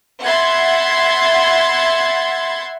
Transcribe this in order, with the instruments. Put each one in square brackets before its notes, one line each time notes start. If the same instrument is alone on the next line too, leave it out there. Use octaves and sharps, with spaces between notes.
[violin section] E5 F#5 B5 C6 G#6 A6